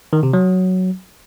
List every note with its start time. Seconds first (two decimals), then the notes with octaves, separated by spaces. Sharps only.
0.13 D#3
0.23 C3
0.33 F#3